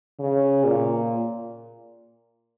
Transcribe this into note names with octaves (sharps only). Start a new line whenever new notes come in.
C#3
A#2